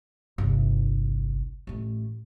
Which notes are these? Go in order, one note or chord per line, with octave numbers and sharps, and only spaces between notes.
G1 C2
A1 A3